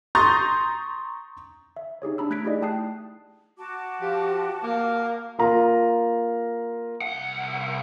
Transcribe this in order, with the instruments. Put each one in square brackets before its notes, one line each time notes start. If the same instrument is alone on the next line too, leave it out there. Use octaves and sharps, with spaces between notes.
[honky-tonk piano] A#5 C6 C#6 D#6 G6 A6
[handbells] E5
D#4 G4 G#4 C#5
D4 A#5 B5 E6
A3 F#6 G#6 B6 D7
D#4 E4 G4 G#4 D5 D#5
A3 G5 A5 D#6 F#6 C7
[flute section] F#4 A5 D6
[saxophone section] F3 G4
A#3
[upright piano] A#3 F4 A#5
[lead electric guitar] C2 F#5